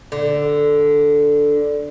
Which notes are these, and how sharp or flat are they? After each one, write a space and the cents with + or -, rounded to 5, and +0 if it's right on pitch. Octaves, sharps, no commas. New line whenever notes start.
D3 +0